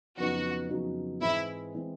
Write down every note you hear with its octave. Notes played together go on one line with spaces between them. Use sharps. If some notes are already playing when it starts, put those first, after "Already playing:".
F2 C#3 F#3 B3 D#4 F#4
F2 C#3 F#3 B3 D#4
G#2 E3 G#3 C4 E4
E3 G#3 C4